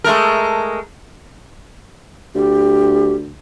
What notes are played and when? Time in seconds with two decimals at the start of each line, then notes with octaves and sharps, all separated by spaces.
0.04 G#3 A3 A#4
2.35 D2 G4